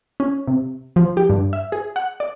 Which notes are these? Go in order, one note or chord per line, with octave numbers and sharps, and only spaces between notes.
C#4
C3
F3
G4
G2
E5
G#4
F#5
D5